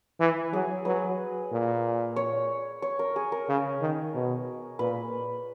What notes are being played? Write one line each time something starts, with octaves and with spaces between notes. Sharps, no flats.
E3
F#3 G#4
F#3 B4
A#2
C#5
C#5
A#4
G#4
A#4
C#3
D#3
B2
A#2 B4